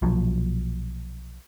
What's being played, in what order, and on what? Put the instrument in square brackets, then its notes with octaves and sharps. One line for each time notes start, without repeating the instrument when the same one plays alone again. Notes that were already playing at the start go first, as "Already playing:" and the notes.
[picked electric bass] B1 A#2 F3 F#3